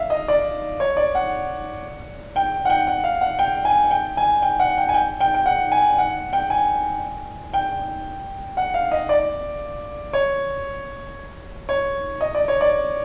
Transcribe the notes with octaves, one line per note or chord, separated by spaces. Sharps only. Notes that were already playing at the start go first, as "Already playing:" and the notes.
Already playing: E5 F5
D#5
D5
C#5
D5
F#5
G5
F#5
G5
F#5
F5
F#5
G5
G#5
G5
G#5
G5
F#5
G5
G#5
G5
G5
G5
F#5
G#5
F#5
G5
G#5
G5
F#5
F5
D#5
D5
C#5
C#5
D#5
D5
C#5
D5